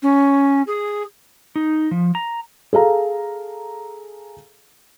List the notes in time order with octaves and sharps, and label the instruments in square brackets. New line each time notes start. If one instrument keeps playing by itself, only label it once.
[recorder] C#4
G#4
[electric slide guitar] D#4
F3
A#5
[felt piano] G#4 A4 F5 A#5